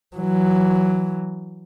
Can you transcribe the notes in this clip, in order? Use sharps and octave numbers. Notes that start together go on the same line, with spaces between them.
E3 F#3